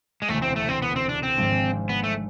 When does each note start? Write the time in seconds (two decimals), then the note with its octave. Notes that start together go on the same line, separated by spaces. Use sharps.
0.22 G#3
0.28 E1 D2 C3 E3 A3
0.42 C4
0.56 A3
0.69 C4
0.82 B3
0.96 C4
1.09 D4
1.23 C4
1.37 G#1 G#2 F3 G#3 D4
1.89 B3
2.04 A3